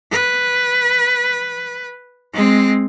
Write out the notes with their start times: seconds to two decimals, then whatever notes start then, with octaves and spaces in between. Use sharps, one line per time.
0.11 B4
2.34 G#3 C4